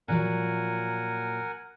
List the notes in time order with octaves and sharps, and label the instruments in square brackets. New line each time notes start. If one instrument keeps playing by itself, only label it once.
[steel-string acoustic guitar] A#2 F3 F#3 [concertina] A#4 F#5 G#5